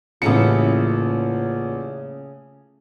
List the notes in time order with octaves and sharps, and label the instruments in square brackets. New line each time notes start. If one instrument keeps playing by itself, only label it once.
[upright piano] A1 C#7 [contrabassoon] A#2 [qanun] C#3 A3 E4